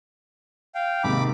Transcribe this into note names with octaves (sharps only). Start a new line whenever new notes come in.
F5 G5
D#2 G#2 C3 B5 D6